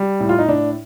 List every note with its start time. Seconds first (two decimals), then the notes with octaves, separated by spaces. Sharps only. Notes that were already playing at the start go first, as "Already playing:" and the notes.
Already playing: G3
0.20 A2
0.29 F4
0.39 D#4
0.48 A2 D4